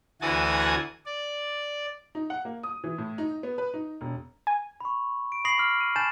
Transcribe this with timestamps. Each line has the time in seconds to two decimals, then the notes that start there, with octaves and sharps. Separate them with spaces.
0.22 D2 E3 F#4 G#5 A5 D#6
1.06 D5
2.15 D#4
2.30 F#5
2.45 A#3
2.63 D#6
2.84 E3
2.98 A2
3.18 D#4
3.43 B3
3.58 B4
3.74 D#4
4.01 E1
4.47 G#5
4.81 B5 C#6
5.32 D7
5.45 B5 C#6 D#6 A#6 C7 F#7
5.58 D6 F6 C7
5.81 D#7
5.96 G#5 A5 B5 G6 A6 E7